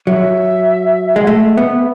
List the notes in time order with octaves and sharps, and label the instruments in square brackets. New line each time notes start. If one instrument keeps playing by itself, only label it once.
[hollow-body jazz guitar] F#3 [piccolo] E5
[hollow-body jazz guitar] G#3
[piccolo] F#5
[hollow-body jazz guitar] A3 [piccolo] E5
[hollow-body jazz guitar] B3 [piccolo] E5
[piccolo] E5